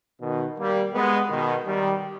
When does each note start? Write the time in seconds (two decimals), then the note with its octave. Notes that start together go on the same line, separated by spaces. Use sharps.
0.21 B2 D#3
0.58 G3 A#3
0.94 G#3 B3
1.30 B2 D#3
1.66 D#3 G3